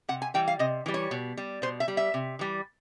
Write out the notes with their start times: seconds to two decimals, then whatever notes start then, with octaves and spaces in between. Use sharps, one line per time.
0.09 C3 F#5
0.22 G#5
0.34 E3 G3 G5
0.48 F5
0.59 C3 D#5
0.86 E3 G3
0.94 C#5
1.11 B2
1.37 G3
1.62 B2 C5
1.80 E5
1.88 G3
1.97 E5
2.14 C3
2.39 E3 G3